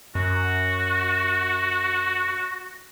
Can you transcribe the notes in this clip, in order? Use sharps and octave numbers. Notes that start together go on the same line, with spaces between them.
F#2 F#4